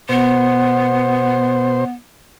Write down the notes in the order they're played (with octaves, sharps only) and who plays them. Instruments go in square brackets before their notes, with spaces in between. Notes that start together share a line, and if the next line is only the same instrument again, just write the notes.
[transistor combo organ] B2 C5 [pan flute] B3